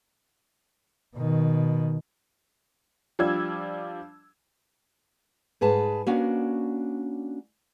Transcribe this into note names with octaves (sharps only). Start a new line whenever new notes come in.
B2 D#3
F3 G3 D4 E6 G#6
G#2 G#4 B4 A5
A#3 C#4 D4 F#4